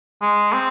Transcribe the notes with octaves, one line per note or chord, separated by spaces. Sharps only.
G#3
C4